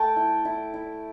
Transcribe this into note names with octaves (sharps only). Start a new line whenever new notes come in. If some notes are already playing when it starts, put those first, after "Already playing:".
Already playing: A3 G5 A5
E4
E4
E4